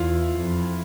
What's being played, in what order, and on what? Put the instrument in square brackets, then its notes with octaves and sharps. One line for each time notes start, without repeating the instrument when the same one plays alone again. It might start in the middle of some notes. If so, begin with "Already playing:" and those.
Already playing: [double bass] E2 [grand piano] E4 F4
[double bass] F2